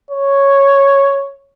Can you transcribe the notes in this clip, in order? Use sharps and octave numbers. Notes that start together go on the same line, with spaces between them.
C#5